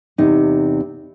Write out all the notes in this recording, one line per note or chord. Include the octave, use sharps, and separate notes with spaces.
E2 C3 D#4